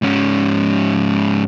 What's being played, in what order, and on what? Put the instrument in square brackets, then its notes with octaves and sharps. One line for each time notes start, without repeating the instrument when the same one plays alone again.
[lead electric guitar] G#2 C#4